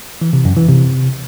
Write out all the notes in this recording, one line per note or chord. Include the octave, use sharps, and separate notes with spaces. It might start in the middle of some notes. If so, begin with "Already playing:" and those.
E3
C3
F#2
E3
C3